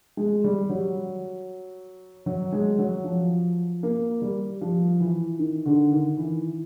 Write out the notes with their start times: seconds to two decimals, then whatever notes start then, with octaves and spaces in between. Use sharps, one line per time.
0.17 G#3
0.44 G3
0.70 F#3
2.26 F#3
2.53 G#3
2.79 F#3
3.04 F3
3.83 A#3
4.22 G3
4.61 F3
5.00 E3
5.39 D#3
5.65 D3
5.92 D#3
6.17 E3